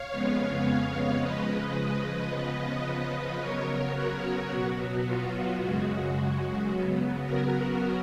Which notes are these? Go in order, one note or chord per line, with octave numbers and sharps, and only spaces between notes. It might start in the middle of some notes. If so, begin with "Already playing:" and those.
Already playing: C#5 F5
F2 C#3 G#3 B3
C#3 F3 G#3 B4 D#5
B4 D#5
C#3 F3 B3
C#3 F#3 B3 A#4 C#5
F#4 A#4
B2 F#3 B3 F#4
F4
F#2 C#3 G#3 F#4
F#4
C#3 F#3 B3
F#4 A#4